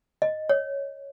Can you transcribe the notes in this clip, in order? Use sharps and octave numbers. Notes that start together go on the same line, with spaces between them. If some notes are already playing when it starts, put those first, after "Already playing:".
D#5
C#5